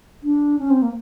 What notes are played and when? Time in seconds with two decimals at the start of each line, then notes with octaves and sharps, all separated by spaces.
0.23 D4
0.59 C#4
0.70 C4
0.82 A#3